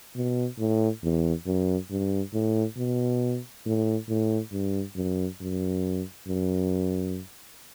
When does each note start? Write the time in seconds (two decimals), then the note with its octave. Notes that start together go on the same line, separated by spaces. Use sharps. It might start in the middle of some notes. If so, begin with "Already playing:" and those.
0.16 B2
0.58 A2
1.03 E2
1.46 F#2
1.91 G2
2.33 A2
2.77 B2
3.66 A2
4.09 A2
4.52 G2
4.96 F#2
5.41 F#2
6.28 F#2